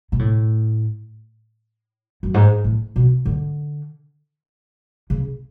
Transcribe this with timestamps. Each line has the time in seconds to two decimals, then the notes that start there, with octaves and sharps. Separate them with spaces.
0.12 B2
0.19 A2
2.23 F#2
2.34 G#2
2.64 A2
2.96 B2
3.26 D3
5.10 C#3